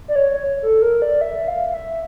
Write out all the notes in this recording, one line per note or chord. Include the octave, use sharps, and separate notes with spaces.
D5
C#5
A4
A#4
D5
E5
F5
F5
E5